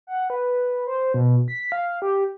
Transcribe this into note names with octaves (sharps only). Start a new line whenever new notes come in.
F#5
B4
C5
B2
B6
F5
G4